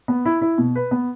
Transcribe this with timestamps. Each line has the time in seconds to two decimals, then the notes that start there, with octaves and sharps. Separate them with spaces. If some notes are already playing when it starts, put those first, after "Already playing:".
0.08 B3
0.25 E4
0.42 E4
0.58 B2
0.76 B4
0.91 B3